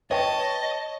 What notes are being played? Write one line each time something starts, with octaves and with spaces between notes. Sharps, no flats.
B4 C#5 D#5 G5 A5